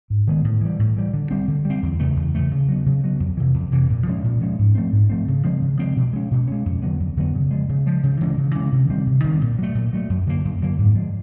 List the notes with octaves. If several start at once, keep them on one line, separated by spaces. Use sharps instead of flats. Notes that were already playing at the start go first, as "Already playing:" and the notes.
G#2
D#3 G#3 B3
A2
E3 G3
A2
E3 G3
D3
G3 C4
D3
G3 C4
E2
C#3 E3 A3
E2
C#3 E3 A3
C#3
F#3 B3
C#3
F#3 B3
F2
C3 E3
F2
C3 E3
A#2
F3 G#3 C#4
A#2
F3 G#3 C#4
G#2
F3 A3 C4
G#2
F3 A3 C4
C#3
F3 G#3 C4
C#3
F3 G#3 C4
B2
G#3 C#4
B2
G#3 C#4
F2
D3 F#3 B3
F2
D3 F#3 B3
C#3
F3 G#3
C#3
F3 G#3
C#3
E3 G#3 C#4
C#3
E3 G#3 C#4
C3
D#3 G3 C4
C3
D#3 G3 C4
A#2
F#3 A3
A#2
F#3 A3
F#2
D3 F#3 A#3
F#2
D3 F#3 A#3
G#2
F3 G#3